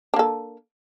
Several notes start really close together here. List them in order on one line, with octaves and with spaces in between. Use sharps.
D4 A#3 A4